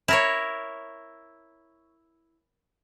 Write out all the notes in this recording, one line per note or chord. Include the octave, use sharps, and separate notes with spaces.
E4 A#4 C#5